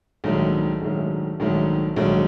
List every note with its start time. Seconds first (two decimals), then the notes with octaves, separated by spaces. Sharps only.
0.24 A#1 G#2 D#3 F#3 A3
0.81 A#1 G#2 D#3 F#3 A3
1.40 A#1 G#2 D#3 F#3 A3
1.96 A#1 G#2 D#3 F#3 A3